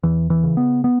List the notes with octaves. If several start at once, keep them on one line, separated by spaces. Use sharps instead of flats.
E2 E3
E3
C#3
B3
B3